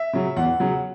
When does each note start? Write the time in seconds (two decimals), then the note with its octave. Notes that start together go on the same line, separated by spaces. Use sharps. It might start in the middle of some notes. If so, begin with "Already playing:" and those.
Already playing: E5
0.13 C#3 F#3
0.36 E2 F#5
0.60 C#3 F#3